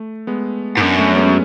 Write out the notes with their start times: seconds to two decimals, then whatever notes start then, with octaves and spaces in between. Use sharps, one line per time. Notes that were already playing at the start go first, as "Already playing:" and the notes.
Already playing: A3
0.27 G#3 B3
0.77 G#2
0.80 F#2 B3 D4
0.98 A3 C#4
1.16 G#3 B3
1.26 C#4